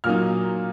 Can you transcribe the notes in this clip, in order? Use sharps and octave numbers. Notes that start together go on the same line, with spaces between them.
A#2 F#3 A#3 D#4 F6